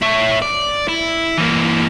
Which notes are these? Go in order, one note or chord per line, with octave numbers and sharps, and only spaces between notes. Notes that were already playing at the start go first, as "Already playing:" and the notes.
E4 C#5
D5
E4
E3 A#3